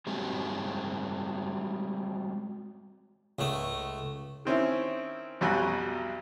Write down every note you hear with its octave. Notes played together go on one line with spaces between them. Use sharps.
G3 G#3 C4 F#4 G4
C#2 A3
D#3 C4 C#4 E4
B1 F2 F#3 G3 F#4 G#5